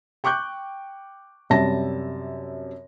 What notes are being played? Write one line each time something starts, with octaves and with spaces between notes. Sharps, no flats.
G5 C#6 D6 F#6 G6
F#2 C3 G3 A5 A#6